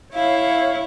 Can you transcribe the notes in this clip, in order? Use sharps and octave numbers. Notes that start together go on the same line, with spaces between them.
E4 C#5 F5